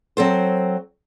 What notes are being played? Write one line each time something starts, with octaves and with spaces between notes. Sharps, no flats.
F#3 C4 A4 C5